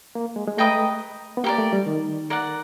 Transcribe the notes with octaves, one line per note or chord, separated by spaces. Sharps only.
A#3
G#3
G#3
A3 B4 D#5 G5 A#5
B3
A#3 G4 A#4 D5
A3
G3
D#3
A#4 D5 F#5